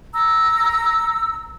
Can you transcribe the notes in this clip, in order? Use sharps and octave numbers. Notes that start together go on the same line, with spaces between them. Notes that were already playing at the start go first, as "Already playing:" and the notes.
A#5 E6